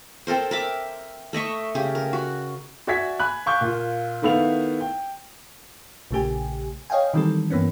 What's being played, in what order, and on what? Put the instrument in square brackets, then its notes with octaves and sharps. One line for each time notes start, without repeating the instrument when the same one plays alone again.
[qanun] C4 A4 A#4 C5
A#4 E5 D6
A3 D#5 E5 C#6
C#3 G4
A#4
F#4
[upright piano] F#4 D5 E5 G#5 G#6 B6
G#5 B5 F#6
F5 G#5 C#6 D6 E6 G6
A#2 F4
D#3 A3 B3 E4 F5 F7
G5
[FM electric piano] A#1 C#3 A3 G4 G#5
C#5 D#5 F5 G5 G#5
D#3 E3 G3 G#3 C4 A4
G2 E3 A#3 B3 C#4